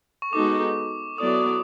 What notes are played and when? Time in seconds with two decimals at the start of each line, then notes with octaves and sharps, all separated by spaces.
0.22 C#6
0.33 G#3 B3 D#4 F#4 A4 D6
1.18 F#3 B3 E4 A4 D5 D#6
1.27 D6
1.34 D#6